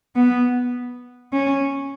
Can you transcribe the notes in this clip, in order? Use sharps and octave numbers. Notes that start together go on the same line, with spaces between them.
B3
C#4